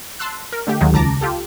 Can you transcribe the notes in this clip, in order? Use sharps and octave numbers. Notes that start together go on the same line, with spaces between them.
A5 C6 E6 F#6
A#4
D3 A3 G4
D#2 D#3 F#3 G#3
C#2 A5 A#5 D6 A#6
F4 G4 A4